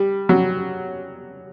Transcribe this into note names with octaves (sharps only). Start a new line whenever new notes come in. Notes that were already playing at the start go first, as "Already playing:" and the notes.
Already playing: G3
F#3